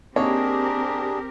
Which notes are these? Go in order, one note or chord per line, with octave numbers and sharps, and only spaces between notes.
A#3 C4 D4 D#4 G4 G#4 A#4 C#5